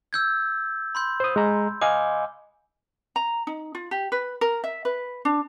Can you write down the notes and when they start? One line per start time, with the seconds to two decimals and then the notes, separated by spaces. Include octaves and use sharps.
0.13 E6 G6 G#6
0.95 B5 C6 G6
1.20 C5 D#6
1.36 G#3 A#5
1.82 D#5 F5 G#5 D6
3.16 A#5
3.47 D#4
3.75 F4
3.91 G4
4.12 B4
4.41 A#4
4.64 E5
4.85 B4
5.25 D4